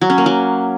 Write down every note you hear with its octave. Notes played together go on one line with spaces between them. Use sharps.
F#3
C#4
A#3
F#3